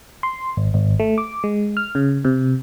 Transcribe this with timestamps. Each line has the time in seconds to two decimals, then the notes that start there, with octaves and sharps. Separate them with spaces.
0.23 C6
0.57 G#1
0.74 G#1
1.00 A3
1.18 D6
1.44 G#3
1.77 F6
1.95 C#3
2.25 C3